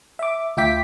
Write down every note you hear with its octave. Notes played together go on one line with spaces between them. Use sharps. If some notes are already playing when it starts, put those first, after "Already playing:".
E5 D6
D2 F4 E5 G5 D6 B6